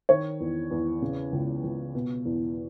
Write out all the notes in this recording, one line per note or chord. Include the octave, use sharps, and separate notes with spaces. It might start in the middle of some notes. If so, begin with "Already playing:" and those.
D#3 C#5
E2
E2
C#3
C#2
C#2
B2
E2